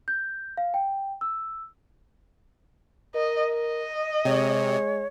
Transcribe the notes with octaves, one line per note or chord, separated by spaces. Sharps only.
G6
F5
G5
E6
A#4 D#5
D#5
C3 G#3 C#5